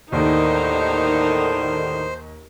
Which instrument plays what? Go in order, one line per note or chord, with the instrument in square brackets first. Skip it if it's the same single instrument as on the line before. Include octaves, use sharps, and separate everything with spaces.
[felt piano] D#2 [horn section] A2 D3 D#3 [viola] D#4 [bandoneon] C5